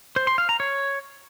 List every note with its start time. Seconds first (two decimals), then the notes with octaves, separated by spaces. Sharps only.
0.16 C5
0.27 C6
0.38 F5
0.49 A#5
0.60 C#5